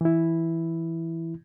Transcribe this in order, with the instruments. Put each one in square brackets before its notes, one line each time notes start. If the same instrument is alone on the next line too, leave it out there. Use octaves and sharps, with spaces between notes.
[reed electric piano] E3 E4